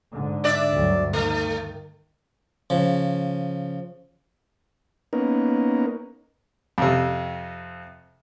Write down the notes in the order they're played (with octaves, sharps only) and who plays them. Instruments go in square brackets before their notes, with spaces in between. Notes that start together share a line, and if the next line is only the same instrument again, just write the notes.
[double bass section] G#2 D3
[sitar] D4 D5 E5
[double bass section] D2 G2 F#3
[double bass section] D#3 [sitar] A3
[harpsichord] C#3 F3
[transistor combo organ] A#3 B3 C#4 D#4 A#4
[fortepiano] F2 C3